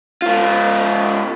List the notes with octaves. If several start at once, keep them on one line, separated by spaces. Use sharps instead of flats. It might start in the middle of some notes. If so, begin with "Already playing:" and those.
G#2 F4